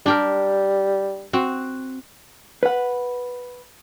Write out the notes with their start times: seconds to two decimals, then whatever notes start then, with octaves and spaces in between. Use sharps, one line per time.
0.06 G3 D4 G4 A#4
1.33 C4 F#4
2.63 B4 F#5